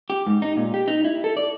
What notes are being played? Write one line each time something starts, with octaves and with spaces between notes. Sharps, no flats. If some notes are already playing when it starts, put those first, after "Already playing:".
G4
G#2
D#4
A#2
G4
D#4
E4
A4
D5